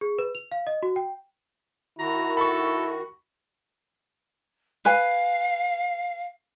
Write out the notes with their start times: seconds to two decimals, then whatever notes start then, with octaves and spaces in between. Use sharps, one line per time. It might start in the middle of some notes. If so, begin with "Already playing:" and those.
0.01 G#4
0.19 B4
0.35 F7
0.52 F5
0.67 D#5
0.83 F#4
0.96 G5
1.99 D#3 E4 F#4 A#5
2.37 A4 B5 C#6
4.85 B4 F5 G#5